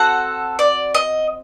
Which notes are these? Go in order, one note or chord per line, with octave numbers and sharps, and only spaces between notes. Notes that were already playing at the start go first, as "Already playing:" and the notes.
Already playing: C4 F#4 A4 F#5
D5
D#5